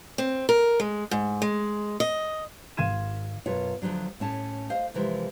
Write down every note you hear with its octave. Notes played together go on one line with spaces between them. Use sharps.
C4
A#4
G#3
G#2
G#3
D#5
G#1 F5 C6 G#6 D#7 E7
F#2 B2 F4 C#5
D2 G#2 F3 F#3 D4
A2 C#4 A5
C5 D#5 F5
C3 E3 F3 G#3 A#4